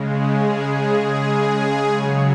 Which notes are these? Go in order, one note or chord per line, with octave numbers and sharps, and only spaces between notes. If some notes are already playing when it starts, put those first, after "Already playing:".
Already playing: C#3 G#3
G#4
G#4
G#4
C#3 F#3 C#5